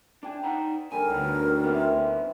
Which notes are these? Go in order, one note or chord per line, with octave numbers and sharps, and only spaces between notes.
D4 D5 G5 G#5
D#4 F#5 A#5
D3 G3 A#4 C#5 G#5
D2 A2 B3 D#4
B3 C4 D4 E4 D6